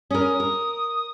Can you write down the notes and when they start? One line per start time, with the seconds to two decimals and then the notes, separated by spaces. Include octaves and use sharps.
0.11 C#4 A#4 D#6
0.40 A#4